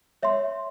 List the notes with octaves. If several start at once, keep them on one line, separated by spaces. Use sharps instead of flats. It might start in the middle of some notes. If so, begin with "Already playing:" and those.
C#5 E5 C6